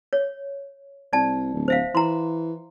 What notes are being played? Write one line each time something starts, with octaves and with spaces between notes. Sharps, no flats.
C#5
C2 D5 A5
D1
C5 E5 F5
E3 A#5 C6